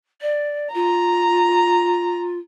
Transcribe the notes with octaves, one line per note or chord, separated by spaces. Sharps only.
D5
F4 A#5